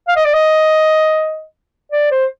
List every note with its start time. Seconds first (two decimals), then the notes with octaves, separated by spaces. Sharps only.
0.08 F5
0.16 D#5
0.25 D5
0.34 D#5
1.92 D5
2.11 C5